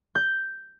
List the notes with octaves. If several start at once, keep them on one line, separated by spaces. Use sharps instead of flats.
G6